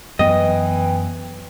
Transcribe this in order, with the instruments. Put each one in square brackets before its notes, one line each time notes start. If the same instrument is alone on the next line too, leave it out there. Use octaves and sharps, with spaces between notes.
[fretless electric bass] F#2 B3 [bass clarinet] E3 [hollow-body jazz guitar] D#5 [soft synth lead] G5